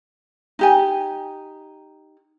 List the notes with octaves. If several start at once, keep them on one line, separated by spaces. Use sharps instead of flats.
D#4 G4 G#5